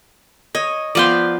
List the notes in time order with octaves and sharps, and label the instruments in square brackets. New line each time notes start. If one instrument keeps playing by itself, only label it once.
[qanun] C#5 [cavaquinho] D#5
[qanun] F3 B3 G5 [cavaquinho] D5 F5 C6